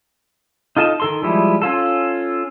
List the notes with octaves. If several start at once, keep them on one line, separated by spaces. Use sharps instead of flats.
D#4 F4 A4 D#5 A5
D#3 A4 C6
F3 G3 G#3 E4
C#4 F4 A4